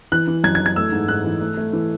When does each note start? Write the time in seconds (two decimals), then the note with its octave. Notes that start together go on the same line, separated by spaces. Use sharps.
0.12 E3 F#6
0.28 E3
0.44 F#2 G#6
0.55 G#6
0.61 E3
0.66 G#6
0.76 A3 E6
0.92 G#2
1.08 G#2 F#6
1.24 E3
1.41 A3
1.57 A3
1.73 E3